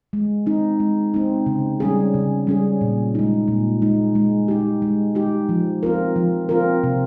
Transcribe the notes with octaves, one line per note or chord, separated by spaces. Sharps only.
G#3
C4 D#4
G#3
C4 D#4
C#3
G3 C#4 G#4
C#3
G3 C#4 G#4
A#2
G#3 D#4
A#2
G#3 D#4
G#3
D#4 G4
G#3
D#4 G4
F3
C4 F4 A#4
F3
C4 F4 A#4
C3